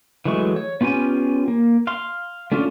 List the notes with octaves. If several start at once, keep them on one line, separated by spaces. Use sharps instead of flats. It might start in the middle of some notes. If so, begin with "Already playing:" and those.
E3 F#3 G#3 A3 C#6
C#5
B3 C#4 F4 G4 G#5
A#3
F5 C6
A3 C#4 D4 F4